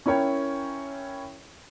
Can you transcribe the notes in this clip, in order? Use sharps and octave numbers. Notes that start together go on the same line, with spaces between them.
C#4 E4 A#4 C#5 G5